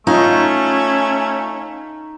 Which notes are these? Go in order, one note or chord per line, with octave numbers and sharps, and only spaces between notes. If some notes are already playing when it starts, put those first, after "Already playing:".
A3 C#4 D#4 F4